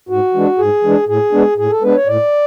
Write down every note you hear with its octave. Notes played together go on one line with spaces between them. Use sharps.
G#2 F#4
E3 G#3 D4
G#2 G#4
E3 G#3 D4
A2 G#4
G#3 B3 D4
A2 G#4
A4
G#3 B3 D4 B4
C#5
A2 D5